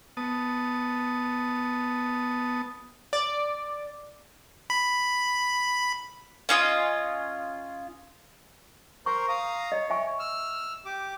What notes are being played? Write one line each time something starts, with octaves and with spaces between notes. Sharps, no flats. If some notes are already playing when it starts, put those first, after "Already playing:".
B3 A5 D#6
D5
B5
C#4 F4 D#5
A#4 C5 A#5 C#6
F5 A#5 D#6
C#5 D#5
E5 G#5 C#6
E6 F6
G4 D6